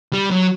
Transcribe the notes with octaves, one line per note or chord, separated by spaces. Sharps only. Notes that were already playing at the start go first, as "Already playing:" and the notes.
G3
F#3